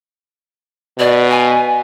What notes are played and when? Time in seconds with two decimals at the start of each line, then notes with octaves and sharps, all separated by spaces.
0.99 B2 D5
1.29 G#5